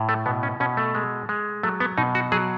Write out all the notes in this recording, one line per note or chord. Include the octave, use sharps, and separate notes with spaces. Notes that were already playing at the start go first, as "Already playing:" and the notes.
Already playing: A2
A3
B2 B3
C#4
B2 C#4
A3
G#3
G#3
F#3 A3
B3
B2 D#4
F#4
F#3 G#4